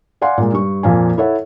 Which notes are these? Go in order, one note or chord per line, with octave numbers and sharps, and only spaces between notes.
D5 F5 F#5 G#5 C6
A#2 G#3
G2 C#6
F2 A#2 F5 G#5
E4 A4 C#5 E5 F#5